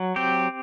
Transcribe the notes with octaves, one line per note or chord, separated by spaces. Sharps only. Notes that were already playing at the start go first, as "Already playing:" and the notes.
Already playing: F#3
C4 G4